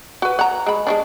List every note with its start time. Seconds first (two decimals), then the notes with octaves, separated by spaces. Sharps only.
0.22 F#4 B4
0.39 F#5 A#5
0.66 G#3 B5
0.87 G#3 C#4 D4